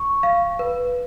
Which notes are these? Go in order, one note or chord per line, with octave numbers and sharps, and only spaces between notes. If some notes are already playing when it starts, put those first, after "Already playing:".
Already playing: C#6
F5
B4